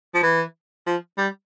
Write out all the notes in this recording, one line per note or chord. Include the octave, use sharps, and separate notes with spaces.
F3
E3
F3
G3